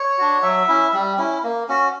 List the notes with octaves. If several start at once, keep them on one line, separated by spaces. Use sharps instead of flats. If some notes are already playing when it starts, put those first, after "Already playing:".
Already playing: C#5
D4 F#4
F#3 E5
C#4 E4
G3
C#4 E4
A#3
C#4 F#4